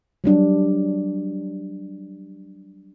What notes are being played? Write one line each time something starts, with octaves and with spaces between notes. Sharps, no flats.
F#3 G3 D4